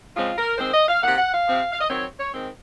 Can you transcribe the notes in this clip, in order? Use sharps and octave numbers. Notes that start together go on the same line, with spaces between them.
C#3 F3 G#3 C4 F4
A#4
D#3 G#3 C4 C5
D#5
F5
C3 D#3 A#3 F#5
F#5
F5
C3 F3 C4
F5
D#5
D#3 F#3 C4 C#5
C#5
D#3 G#3 C4